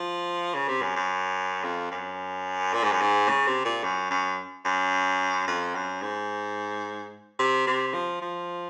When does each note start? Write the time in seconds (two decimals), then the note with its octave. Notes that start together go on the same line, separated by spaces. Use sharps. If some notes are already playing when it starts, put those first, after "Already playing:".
Already playing: F3
0.54 C#3
0.68 C3
0.82 F#2
0.96 F#2
1.64 F2
1.91 F#2
2.74 A#2
2.83 G#2
2.92 F#2
3.01 G#2
3.29 C#3
3.47 C3
3.65 A#2
3.83 F#2
4.10 F#2
4.65 F#2
5.47 F2
5.75 F#2
6.02 G#2
7.39 C3
7.67 C3
7.94 F3
8.22 F3